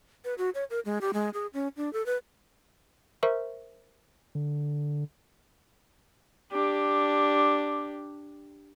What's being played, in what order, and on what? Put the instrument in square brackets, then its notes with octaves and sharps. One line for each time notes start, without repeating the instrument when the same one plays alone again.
[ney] B4
F#4
C#5
A#4
G#3
G4
G#3
G#4
C#4
D4
A4
B4
[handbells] A#4 C5 E5 C#6
[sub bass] D3
[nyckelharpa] D4 G4